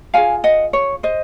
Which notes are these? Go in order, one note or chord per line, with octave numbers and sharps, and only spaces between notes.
F4 G#4 F5 G#5
D#5 F#5
C#5
C5 D#5